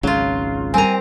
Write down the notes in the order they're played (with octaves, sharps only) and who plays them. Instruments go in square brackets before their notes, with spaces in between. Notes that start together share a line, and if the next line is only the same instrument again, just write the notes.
[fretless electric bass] G#1 C#2 C#3 [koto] F#3 F4
[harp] G3 A#4 C5 [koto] C4 A#5 [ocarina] G#5